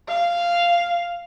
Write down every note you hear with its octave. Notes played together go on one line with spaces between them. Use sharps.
F5